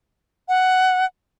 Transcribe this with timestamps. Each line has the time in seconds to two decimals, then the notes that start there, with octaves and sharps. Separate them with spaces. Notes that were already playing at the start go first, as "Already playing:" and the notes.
0.49 F#5